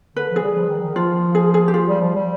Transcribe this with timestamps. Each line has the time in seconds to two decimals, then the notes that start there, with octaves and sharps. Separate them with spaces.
0.16 D3 B4
0.30 F3
0.36 G#4
0.43 G3
0.56 F3
0.69 D#3
0.82 D#3
0.95 F3 F4
1.35 G#4
1.54 G#4
1.68 G4
1.74 F4
1.88 G3
2.01 F3
2.15 G3